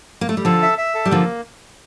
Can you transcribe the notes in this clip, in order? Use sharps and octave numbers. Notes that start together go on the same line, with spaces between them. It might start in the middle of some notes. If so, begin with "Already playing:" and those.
A#3
A3
G3
D3 F3 A4
E5
E5
A4
G3
D3 F3 A#3